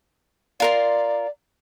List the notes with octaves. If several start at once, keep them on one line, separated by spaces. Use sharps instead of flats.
F4 A#4 D5 C6